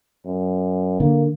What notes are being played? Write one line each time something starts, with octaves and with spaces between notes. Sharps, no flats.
F#2
D3 A#3